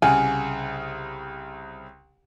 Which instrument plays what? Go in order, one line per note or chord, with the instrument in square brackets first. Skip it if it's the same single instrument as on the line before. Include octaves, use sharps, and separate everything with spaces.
[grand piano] C2 C#3 F#5 [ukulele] G#5